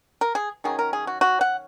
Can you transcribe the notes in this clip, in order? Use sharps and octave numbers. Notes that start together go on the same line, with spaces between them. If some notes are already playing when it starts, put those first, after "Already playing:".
A#4
G#4
D#3 F#3 C#4 G#4
A#4
G#4
F#4
F#4
F#5